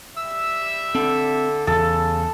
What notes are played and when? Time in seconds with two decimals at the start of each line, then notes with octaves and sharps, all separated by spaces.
0.17 G3 E5 E6
0.95 D3 C4 A4
1.67 E2 C#3 A4